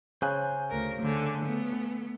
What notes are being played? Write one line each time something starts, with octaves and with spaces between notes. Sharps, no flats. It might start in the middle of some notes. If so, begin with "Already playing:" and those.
C#3 C5 G#5 F#6
D2 A#4
D3 A3
A3 B3